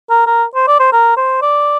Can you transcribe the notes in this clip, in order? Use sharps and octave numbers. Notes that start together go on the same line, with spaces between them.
A#4
A#4
C5
D5
C5
A#4
C5
D5